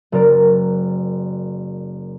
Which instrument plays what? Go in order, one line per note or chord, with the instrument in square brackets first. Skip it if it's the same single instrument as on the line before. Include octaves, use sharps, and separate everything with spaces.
[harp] F#1 A#4 D5